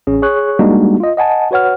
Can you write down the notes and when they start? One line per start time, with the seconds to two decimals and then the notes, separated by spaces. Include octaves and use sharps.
0.07 A1 C#4 G#4
0.22 G#4 C#5 C#6 F#6
0.59 G3 G#3 A#3 D4 D#4 F#4
1.00 F4 D#5
1.17 D#5 F#5 G#5 A5
1.51 F#4 B4 C#5 F#5 F6